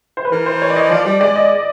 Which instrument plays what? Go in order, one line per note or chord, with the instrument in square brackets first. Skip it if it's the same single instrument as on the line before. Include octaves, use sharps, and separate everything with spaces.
[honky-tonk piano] C5
B4
[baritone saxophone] E3 [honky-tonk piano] A#4
[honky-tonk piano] C5
C#5
D5
D#5
[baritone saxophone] F3 [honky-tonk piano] D5
[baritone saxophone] G3
[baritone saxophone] G#3 [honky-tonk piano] D5
[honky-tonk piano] D#5